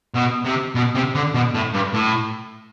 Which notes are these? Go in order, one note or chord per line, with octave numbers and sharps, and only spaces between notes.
B2
C3
B2
C3
D3
B2
A2
G2
A2